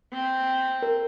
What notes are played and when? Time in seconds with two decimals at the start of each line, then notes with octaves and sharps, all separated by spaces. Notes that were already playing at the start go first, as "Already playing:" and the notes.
0.12 C4
0.82 A#4